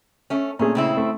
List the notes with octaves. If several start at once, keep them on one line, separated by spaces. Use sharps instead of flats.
A3 C#4
A#2 A3 C#4 G#4
C#3 C4 E4
A3